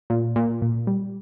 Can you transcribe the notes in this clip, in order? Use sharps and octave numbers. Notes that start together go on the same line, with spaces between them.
A#2
A#2
A#2
G3